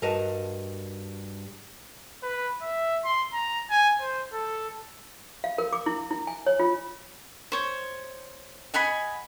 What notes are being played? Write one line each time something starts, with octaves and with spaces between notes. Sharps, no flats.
G2 G3 F#4 A#4 D#5 A5
B4
E5
C6
A#5
G#5
C5
A4
F5
A#4
D6
E4
E4
G#5
C#5
F4
C5 C#5
D#5 F#5 G#5 B5